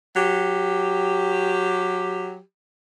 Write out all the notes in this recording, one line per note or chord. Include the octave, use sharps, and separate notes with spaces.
F#3 G4